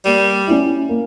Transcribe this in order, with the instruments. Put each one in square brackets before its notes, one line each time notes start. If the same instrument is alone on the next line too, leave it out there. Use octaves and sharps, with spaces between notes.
[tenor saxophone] G3 [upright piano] A#3
[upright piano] C#4 E4
A#3